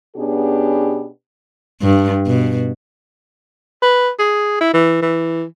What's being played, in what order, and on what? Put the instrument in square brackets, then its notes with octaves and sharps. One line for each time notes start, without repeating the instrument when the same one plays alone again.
[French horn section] B2 B3 C#4 D4 G4 G#4
[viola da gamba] G2
B2
[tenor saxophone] B4
G#4
E4
E3
E3